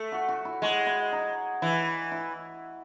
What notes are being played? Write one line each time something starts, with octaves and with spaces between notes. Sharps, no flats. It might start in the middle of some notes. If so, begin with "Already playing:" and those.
Already playing: A3
F#4
F#4
E4
G#3 F#4
E4
D#4
E3 E4
E4